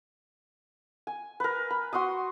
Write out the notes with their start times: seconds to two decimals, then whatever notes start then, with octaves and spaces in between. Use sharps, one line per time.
1.07 G#5
1.40 A#4 B4
1.70 B5
1.93 F#4 C6 C#6 D#6